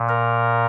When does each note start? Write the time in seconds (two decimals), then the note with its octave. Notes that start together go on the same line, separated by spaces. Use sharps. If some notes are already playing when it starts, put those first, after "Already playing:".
Already playing: A#2
0.09 A#4